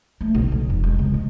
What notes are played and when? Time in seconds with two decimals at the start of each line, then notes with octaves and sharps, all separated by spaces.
0.21 A3
0.35 B1
0.52 B1
0.70 F1
0.84 G#3
0.99 C3
1.14 G#3